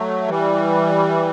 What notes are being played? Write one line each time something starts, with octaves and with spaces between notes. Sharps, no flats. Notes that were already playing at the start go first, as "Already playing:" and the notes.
Already playing: F#3 A3
E3 G3